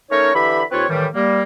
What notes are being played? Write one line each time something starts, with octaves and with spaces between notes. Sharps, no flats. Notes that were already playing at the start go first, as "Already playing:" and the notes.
A3 C#4 D#4 A#4 C#5
D3 E3 G4 E5 B5
D#2 C4 F4 B4 C#5
A2 D#3 E3 G3
G3 A#3